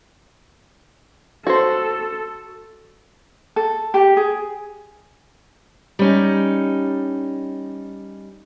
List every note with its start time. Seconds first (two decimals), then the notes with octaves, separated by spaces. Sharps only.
1.47 F#4 A4 C5
3.56 A4
3.94 G4
4.17 G#4
5.99 G3 C#4 D#4